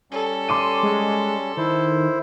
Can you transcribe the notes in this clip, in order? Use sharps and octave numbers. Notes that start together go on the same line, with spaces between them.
G3 C#4 A4
C6 D6 D#7
G#3
D#3 E4 C5